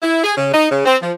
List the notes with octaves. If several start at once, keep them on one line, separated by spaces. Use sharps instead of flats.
E4
G#4
C#3
D#4
C#3
C4
F3